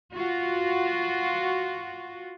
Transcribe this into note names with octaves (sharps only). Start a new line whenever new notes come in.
F4 F#4